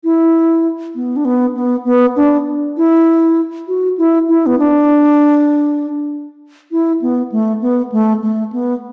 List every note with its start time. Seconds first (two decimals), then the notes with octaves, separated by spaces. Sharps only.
0.04 E4
0.95 B3
1.16 D4
1.25 B3
1.55 B3
1.85 B3
2.16 D4
2.77 E4
3.68 F#4
3.98 E4
4.29 E4
4.46 B3
4.59 D4
6.71 E4
7.02 B3
7.32 A3
7.61 B3
7.92 A3
8.23 A3
8.53 B3